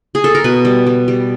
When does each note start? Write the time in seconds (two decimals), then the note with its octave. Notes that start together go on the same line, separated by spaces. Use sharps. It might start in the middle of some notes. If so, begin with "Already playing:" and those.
0.15 G#4
0.24 A4
0.35 A#4
0.44 B2 B4
0.65 G3
0.87 G3
1.08 G3